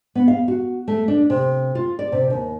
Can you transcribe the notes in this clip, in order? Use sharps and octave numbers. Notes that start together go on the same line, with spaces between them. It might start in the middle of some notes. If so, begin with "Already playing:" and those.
B3
F5
F#4
A3
D4
C3
F4
D5
C3
D#2